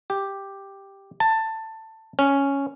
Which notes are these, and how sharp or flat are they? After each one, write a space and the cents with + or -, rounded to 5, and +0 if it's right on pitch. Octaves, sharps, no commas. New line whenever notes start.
G4 +0
A5 +15
C#4 +0